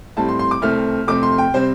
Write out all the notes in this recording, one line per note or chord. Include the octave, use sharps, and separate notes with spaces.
A2 G3 C4 A5
C6
C6
D6
C2 C3 A3 C4 F6
F2 C3 A3 C4 D6
C6
G5
C3 G3 C4 C5